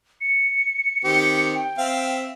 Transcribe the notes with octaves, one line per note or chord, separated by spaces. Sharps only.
C#7
D#3 C4 G4
G5
C4 E5 F5